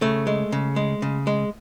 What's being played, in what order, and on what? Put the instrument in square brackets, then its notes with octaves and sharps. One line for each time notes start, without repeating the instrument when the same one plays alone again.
[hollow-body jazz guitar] C#3 A3
G#3
C#3
G#3
C#3
G#3